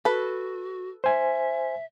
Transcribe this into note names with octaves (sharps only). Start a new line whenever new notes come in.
F#4 A4 B4
C5 E5 G#5